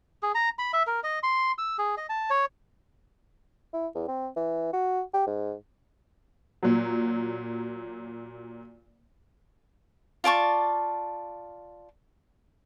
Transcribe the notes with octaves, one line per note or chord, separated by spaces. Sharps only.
G#4
A#5
B5
E5
A#4
D#5
C6
E6
G#4
D#5
A5
C#5
E4
E2
C4
E3
F#4
G4
G#2
A#2 F#3
F4 D5 A5 C#6